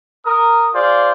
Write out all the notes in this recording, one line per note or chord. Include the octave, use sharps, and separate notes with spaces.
A#4 D#6
F4 G#4 C5 D5